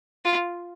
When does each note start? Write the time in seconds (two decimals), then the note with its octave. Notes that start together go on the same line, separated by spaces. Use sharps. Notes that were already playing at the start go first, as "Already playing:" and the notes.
0.25 F4